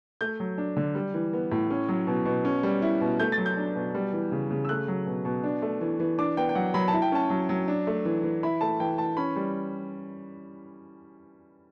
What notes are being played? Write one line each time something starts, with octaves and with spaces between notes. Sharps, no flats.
A3 G6
F#3
D4
D3
G3
E3
B3
A2
C#4
F#3
B2
B2
C#4
G3
E4
B2
A3 G6
A6
F#3
G6
D4
B2
G3
E3
C#3
C#3
E6
A3 F#6
F#3
B2
B2
D4
A3
E3
E3
D4 D6
B3 G5
G5
F#3 F#5
F#3 B5
A5
E4
G5
C#4 A5
F#3
F#3
D4
A3
E3
E3
E4 B5
A3 A5
E3 G5
E3 A5
C#4 B5
G3